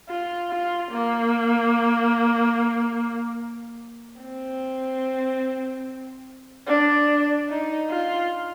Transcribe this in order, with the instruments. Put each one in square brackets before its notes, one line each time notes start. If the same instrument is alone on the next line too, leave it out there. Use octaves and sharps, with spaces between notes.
[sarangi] F4
F4
A#3
C4
D4
D#4
F4